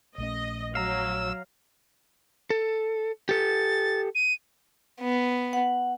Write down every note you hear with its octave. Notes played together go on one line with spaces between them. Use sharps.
A#1 A3 C#4 D#5
F#3 F5 A#5 E6
A4
G4 A4 A6
D#7
B3
F#5